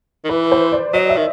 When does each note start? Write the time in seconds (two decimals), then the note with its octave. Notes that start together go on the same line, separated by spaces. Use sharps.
0.24 D#3
0.29 E3 B4
0.52 C5
0.72 D5
0.94 F#3 D#5
1.10 E5
1.17 D#3